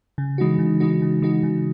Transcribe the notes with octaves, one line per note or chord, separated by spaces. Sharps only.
C#3
E3 G#3 D#4 F#4
C#3
E3 G#3 D#4 F#4
C#3
E3 G#3 D#4 F#4
C#3